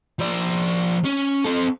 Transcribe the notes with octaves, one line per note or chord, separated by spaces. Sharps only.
F3 D5
C#4
C4 A4